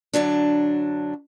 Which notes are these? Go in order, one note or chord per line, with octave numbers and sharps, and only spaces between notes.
F#2 D3 F#3 D4